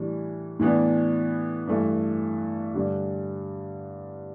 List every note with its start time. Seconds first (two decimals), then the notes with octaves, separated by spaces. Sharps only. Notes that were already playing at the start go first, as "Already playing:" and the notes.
Already playing: A2 E3 G3 D4
0.59 A2 E3 B3 D4
1.67 G2 E3 A3
2.74 G2 D3 G3